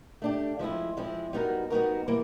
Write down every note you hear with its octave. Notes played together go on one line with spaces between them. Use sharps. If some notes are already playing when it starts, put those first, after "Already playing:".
A3 D4 G4
F3 G#3 C4 E4
F3 G#3 C4 E4
G3 B3 D#4 F#4 A#4
G3 B3 D#4 F#4 A#4
E3 G3 A#3